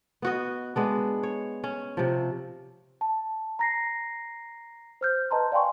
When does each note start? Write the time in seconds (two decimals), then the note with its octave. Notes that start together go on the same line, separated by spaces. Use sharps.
0.22 B3 F#4 D#5
0.76 G#3 B3 D4
1.23 C#5
1.64 C#4
1.97 C3 F3
3.01 A5
3.59 A#5 A#6 C7
5.01 C5 F6 G6
5.31 B4 D#5 A5 A#5 C6
5.52 D5 F5 G5 G#5 C6 C#6